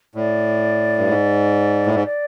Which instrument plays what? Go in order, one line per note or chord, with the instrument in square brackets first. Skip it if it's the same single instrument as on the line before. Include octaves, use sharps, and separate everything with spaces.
[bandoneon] A2 [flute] D5
[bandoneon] G2
G#2
A2
G#2
[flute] D5